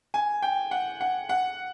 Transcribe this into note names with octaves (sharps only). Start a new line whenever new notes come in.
G#5
G5
F#5
F#5
F#5